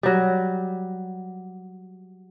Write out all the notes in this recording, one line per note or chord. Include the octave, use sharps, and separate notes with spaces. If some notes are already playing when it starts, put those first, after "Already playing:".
F#3 G3